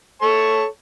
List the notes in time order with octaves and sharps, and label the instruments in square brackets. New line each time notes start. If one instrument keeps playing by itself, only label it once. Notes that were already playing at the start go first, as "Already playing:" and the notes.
[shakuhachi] A4 [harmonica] C#5 A5 C#6